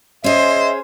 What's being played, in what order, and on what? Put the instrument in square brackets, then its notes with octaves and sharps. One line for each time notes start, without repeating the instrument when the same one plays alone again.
[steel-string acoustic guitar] C#4 G#4 [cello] C5 [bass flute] D#5 [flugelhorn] E5